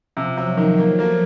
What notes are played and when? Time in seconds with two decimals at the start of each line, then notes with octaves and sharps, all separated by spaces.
0.17 C3 F3
0.37 C3 F#3
0.57 D#3 F3
0.78 F#3 A#3
0.99 A3 A#3